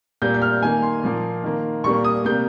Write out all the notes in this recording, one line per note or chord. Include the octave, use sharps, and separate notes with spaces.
A#2 G3 A#3 G6
G6
F6
D#3 A#3 G#5
C6
A#2 F3 A#3
D#3 A#3
A#2 G3 A#3 C#6
D#6
C3 G3 A#3 G6